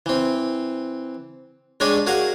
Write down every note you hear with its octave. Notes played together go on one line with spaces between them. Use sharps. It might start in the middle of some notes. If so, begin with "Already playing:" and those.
E3 C4
G3 G#3 D4 G#4 C#5 D#5
F#4 G#4 A#4 F5 F#5